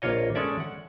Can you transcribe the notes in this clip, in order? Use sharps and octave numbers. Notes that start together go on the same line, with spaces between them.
A#1 A#3 F4 C#5 D#5
G#3 C#4 A4 D5 E5
F#5